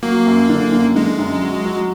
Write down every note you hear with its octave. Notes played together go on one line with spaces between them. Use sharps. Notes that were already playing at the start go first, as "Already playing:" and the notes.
F#3 A#3
F#2
D3
F#2
D3 G#3
F#2
F#3
F#3